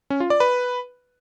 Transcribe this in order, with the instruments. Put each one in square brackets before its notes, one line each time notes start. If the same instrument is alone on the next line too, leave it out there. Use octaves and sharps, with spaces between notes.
[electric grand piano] C#4
F4
D5
B4